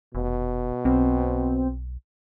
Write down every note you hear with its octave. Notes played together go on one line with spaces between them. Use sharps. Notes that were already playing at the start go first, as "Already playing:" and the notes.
F1 B2
B1 C4